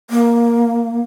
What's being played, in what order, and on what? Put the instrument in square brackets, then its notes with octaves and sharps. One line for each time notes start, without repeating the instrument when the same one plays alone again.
[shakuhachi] A#3